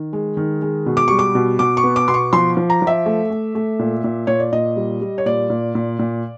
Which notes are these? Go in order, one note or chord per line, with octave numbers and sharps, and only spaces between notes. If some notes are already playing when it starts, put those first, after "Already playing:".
Already playing: D#3
G#3
D#3
G#3
B2
D6
G3 C#6
D6
B2
B2 D6
C#6
B3
D6
B2 C6
C#6
F3 C6
F3
A#5
F3
E5
A3
A3
A3
A#2
A#2
A#2 C#5
D5
A#2 D#5
G3
G3
C#5
A#2 D5
A#2
A#2
A#2